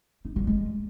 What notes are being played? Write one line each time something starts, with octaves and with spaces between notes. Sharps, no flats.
D#4
G3
G#3